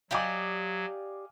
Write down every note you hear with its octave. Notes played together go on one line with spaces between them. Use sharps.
F#3 G4 D5 D#5 F5 G#5 D6